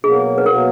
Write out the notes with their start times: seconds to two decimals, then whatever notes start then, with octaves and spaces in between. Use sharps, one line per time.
0.03 B2 F#3 A#3 G#4
0.38 B4
0.46 B2 F#3 A#3 A#4